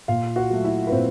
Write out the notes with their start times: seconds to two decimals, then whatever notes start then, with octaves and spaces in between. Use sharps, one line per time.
0.08 A#2 F4 F5
0.36 F#4 F#5
0.50 F#3 A3
0.64 E4 E5
0.87 B4
0.92 A#2 C4 C5